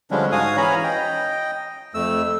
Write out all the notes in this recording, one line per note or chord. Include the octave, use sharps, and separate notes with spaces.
D3 F3 G3 G#3 C#4 D4
G#2 F#4 F5 G#5 D#6
E3 C#4 C#5 A#5 B5
D#5 G5
F2 A3 E6